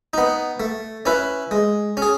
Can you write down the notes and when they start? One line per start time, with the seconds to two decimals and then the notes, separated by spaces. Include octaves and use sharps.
0.13 B3 D#4
0.60 A3
1.06 C#4 E4 B4
1.51 G#3
1.97 C#4
2.02 G#4